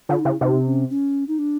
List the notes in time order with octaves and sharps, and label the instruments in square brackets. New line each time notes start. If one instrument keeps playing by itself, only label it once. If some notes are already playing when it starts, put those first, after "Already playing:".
[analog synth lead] D3 [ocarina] F4
[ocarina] D#4
[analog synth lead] C#3 [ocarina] E4
[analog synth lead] C3 [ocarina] D#4
[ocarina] C#4
C#4
D#4
D4